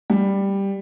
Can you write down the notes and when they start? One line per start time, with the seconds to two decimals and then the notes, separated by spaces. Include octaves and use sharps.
0.10 G3